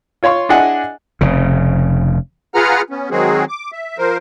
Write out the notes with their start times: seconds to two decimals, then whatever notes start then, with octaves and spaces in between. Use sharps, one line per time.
0.23 F4 C#5 F5 C6 C#6
0.49 D4 E4 G#4 D#5 F#5 G#5
1.21 F1 C#3
2.54 F4 G#4 B4 F#5 A#5 F6
2.90 B3 C#4
3.11 D#3 F#3 G#3 C4 F#4 G#4
3.49 D6
3.72 E5
3.98 F3 A#4 C5